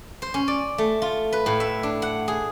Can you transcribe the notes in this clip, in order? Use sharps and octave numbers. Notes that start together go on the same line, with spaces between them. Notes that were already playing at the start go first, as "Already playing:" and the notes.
C5
C#4
D5
A3
F4
B4
A2
E5
D4
F#5
G#4